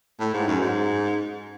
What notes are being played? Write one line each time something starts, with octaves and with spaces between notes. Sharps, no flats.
A2
G#2
F#2
G#2